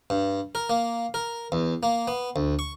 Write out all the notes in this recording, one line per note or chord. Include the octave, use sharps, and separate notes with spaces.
G2
A#4
A#3
A#4
E2
A#3
B3
D2
C#6